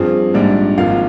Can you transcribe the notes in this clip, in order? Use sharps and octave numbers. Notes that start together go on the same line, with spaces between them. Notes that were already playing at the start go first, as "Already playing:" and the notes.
Already playing: G2 F3 C4 G#4
A#1 G#2 G3 D4
G#1 G#2 F3 F5